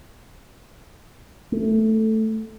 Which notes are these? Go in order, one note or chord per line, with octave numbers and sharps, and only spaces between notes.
A3